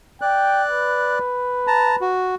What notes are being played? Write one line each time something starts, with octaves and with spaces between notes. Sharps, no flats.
D5 G5 F#6
B4
A5 A#5
F#4